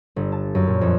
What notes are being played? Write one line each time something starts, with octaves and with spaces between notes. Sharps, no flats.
G1
A5
F#2
A#2
F2